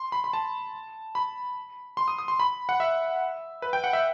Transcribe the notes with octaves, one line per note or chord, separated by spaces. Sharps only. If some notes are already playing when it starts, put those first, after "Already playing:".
Already playing: C6
B5
B5
A5
B5
C6
D#6
D#6
C6
B5
F#5
E5
B4
G5
F#5
E5